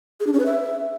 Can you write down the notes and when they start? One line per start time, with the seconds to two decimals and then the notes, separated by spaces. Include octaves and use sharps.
0.20 G#4
0.27 D4
0.33 C#4
0.39 B4
0.46 E5